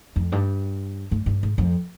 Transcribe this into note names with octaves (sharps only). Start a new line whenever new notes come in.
F2
G2
G2
G2
G#2
F2